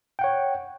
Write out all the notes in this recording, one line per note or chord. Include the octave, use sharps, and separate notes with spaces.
C#5 F#5 G5